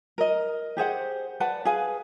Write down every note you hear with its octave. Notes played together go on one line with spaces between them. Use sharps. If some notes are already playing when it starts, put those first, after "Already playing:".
A#4 D#5
G4 G#4 C5 F#5
B4 D5 F#5 A5
G#4 B4 F5 G#5